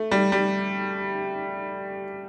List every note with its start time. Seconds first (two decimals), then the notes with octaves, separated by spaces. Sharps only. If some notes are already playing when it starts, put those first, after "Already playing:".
Already playing: A3
0.11 G3
0.32 G3